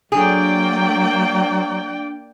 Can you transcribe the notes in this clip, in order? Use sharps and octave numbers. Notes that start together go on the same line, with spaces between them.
F#3 A#3 D4 G#4 D5 G5